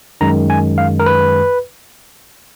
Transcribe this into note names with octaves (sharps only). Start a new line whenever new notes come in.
F#2 D#3 G#3 A#5
G#5
F5
A#4
B4